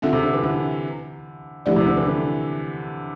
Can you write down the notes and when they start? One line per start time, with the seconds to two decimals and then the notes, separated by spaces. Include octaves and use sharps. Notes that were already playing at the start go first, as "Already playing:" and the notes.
0.02 D3 C4 F4 A4 E5
0.13 C3
0.23 D3
0.33 E3
0.44 D3
1.66 D3 F3 A3 E4 G4 D5
1.76 C3
1.87 D3
1.97 E3
2.06 D3